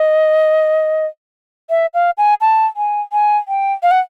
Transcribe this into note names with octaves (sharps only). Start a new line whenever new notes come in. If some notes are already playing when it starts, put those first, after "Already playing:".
Already playing: D#5
E5
F5
G#5
A5
G#5
G#5
G5
F5
F#5